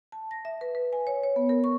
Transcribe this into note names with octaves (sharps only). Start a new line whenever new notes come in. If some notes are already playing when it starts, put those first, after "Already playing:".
A5
A#6
E5
B4
B4
G#5
C#5
C#5
B3
A#4
C#6